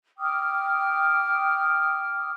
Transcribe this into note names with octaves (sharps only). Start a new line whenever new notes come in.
G5 D6 D#6 F6